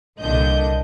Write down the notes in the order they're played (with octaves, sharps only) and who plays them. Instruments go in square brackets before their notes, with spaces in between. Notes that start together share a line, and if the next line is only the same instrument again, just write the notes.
[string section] C2 A#2 D3 D4 D#5 G6